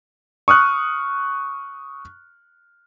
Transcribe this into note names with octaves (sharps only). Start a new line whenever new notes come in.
C#6 D#6 F6 F#6